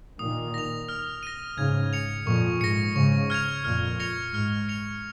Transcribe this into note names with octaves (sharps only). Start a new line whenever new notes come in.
A#2 D#3 D#6
A#6 F7
F6
A#6 D#7
G#2 C#3 G#6
C#7 F7
F2 A#2 C#6
G#2 A#6 C#7
G#2 C#3 C#6
F6 G#6 C#7 F7
F2 A#2 F6
A#6 C#7 F7
G#2 F6
C#7 F7